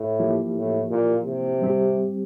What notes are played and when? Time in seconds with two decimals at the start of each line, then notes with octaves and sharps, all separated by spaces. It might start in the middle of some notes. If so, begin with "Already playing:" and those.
Already playing: A2
0.19 F3 A#3 E4 G4
0.55 A2
0.90 A#2
1.26 C3
1.62 G3 C4 G4